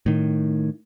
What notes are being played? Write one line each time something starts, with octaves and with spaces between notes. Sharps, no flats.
A2 D#3